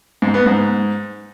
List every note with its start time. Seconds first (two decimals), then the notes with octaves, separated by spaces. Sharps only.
0.22 G#2
0.34 B3
0.46 G#2